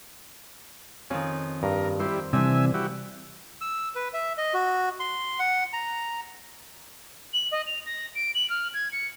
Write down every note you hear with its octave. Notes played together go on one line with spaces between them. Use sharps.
F2 D#3 C#4
G2 A#4
G3 E4 C5
C3 E3 G3 C4 D4 E5 G#5
E4 F#4 G4
E6
B4
E5
D#5
F#4
C6
F#5
A#5
F#7
D#5
F7
A#6
D7
F#7
F6
G#6
C#7